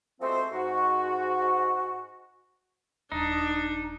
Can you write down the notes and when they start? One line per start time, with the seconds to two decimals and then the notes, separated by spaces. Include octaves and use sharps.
0.20 F3 G#3 A3 C4 F#4 C5
0.51 G#2 F#4
3.12 D#1 D4 D#4